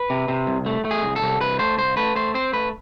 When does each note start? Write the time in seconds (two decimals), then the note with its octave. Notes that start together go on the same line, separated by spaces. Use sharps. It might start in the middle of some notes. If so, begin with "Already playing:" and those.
Already playing: B4
0.10 C3
0.28 C3
0.47 C2
0.66 A3
0.85 A3
0.91 G#4
1.03 C2
1.16 A4
1.22 C2
1.41 C2 B4
1.59 A3 C5
1.78 C2 C5
1.97 A3 B4
2.15 A3 C5
2.34 C4 C5
2.53 A3 B4